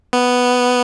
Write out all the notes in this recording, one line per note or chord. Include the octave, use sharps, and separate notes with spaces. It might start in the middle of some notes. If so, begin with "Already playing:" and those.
B3